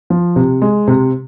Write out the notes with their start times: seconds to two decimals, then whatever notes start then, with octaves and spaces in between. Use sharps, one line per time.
0.10 F3
0.36 C3
0.62 G#3
0.88 C3